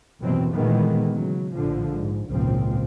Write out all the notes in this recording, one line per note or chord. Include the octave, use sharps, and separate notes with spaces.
F#1 D#2 B2 E3 F#3 C4
A#2 D#3 E3 G#3 A3 B3
C#3 F#3
A#1 A2 D3 F3
G#2
G#1 C#2 A#2 F3 C4